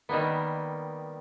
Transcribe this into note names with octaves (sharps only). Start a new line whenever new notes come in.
D#3 G3 A#3 B3